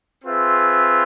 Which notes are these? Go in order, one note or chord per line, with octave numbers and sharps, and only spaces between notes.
C4 F4 G#4 B4 E5